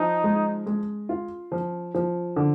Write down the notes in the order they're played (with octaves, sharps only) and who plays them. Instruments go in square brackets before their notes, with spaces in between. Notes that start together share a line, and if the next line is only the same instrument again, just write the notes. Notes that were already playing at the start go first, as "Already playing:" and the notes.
Already playing: [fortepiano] F3 [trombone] D#4
[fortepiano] G#3
G#3
F4
F3
F3
D3